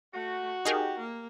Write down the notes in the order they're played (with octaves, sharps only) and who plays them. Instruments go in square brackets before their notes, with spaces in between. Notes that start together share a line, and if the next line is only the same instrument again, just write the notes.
[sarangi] A3 [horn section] F#4
[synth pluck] D#4 G#4 A#4 [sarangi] G4
[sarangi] A#3